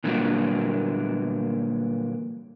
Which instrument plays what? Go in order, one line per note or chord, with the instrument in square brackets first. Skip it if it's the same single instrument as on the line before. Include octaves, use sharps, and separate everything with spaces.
[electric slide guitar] A#2 D3 E3 F#3 G3 A#3